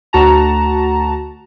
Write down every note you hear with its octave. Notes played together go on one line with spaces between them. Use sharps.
D2 F#4 A5 A#5